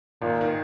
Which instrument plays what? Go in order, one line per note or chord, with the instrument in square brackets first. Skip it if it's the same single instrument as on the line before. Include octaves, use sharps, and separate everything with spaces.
[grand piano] G#1 [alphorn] A#2
[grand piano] D#3